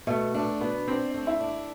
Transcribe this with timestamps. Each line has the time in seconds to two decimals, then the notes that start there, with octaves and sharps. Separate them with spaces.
0.07 B2 A3
0.34 A3 D4
0.60 B2 B3
0.88 C4 D4
1.14 A3
1.27 E4
1.40 D4